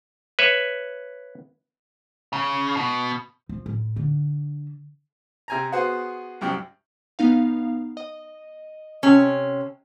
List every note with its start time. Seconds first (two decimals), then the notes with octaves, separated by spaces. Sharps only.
0.39 B4 C#5 E5
2.33 C#3
2.77 B2
3.49 F3
3.66 A2
3.96 D3
5.48 C3 G#5 A#5
5.72 B3 F#4 G#4 C5
6.41 C2 F#2 G4
7.19 B3 D#4 F5
7.97 D#5
9.03 C3 C#4